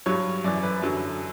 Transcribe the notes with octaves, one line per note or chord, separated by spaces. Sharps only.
G2 F#3 C#5
F#2 E3 D5
B4
F#2 D3 F#3